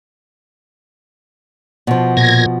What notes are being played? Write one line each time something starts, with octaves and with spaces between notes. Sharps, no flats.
B2 F3
A#2 G#6 A#6